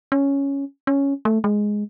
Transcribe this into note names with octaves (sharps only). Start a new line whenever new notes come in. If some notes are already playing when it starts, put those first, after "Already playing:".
C#4
C#4
A3
G#3